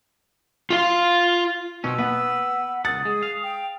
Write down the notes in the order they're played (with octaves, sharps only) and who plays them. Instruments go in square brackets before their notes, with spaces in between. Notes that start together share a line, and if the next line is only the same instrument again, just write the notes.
[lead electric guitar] F4 F5
[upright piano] B2 [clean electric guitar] C4 C#4 [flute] E6
[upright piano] B3 [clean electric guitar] B4 [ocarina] F#5
[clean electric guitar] C#2 F#5 [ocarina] D#6 [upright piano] A6
[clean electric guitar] G#3 [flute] G#4
[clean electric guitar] F5
[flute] G5